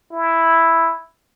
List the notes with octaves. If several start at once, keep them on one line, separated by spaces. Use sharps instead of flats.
E4